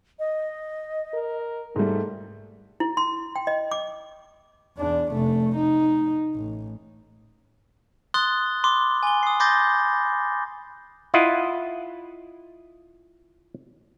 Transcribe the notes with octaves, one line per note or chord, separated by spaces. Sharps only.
D#5
A#4
G#2 G3 A3
E4
C6
G5
D#5
D6
E2 D4
F1 A3
D#4
A1
C6 D#6 F#6 A6 G7
B5 C6 D6
G#5 G7
D#6 C7
B5 C6 D6 G6 A6 A#6
E4 F4 D#5 F#5